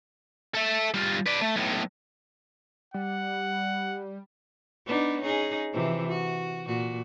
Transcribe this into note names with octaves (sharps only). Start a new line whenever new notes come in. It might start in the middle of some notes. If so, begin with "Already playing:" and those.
A4 E5
G3 F4
B4 D5
A3
B1 A2
G3 F#5
B3 D4 D#4
C#4 D#4 G#4
C3 E3 F3
F#4
A#2 F#4